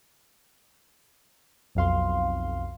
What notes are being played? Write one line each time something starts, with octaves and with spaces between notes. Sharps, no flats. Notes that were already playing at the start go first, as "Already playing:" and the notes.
B1 F2 F5 C6